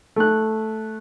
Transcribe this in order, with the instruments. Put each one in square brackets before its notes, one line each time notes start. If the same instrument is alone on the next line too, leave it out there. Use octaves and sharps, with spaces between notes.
[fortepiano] A3 F#6